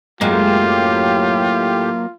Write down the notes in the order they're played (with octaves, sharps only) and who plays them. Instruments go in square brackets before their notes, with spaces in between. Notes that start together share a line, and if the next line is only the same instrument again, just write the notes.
[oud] F#2 G#3 [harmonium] A2 G4 [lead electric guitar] F#3 A#3 [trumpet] F4